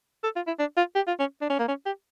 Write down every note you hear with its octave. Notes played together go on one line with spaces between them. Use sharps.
A4
F4
E4
D4
F4
G4
F4
C#4
D4
C#4
A#3
C#4
G4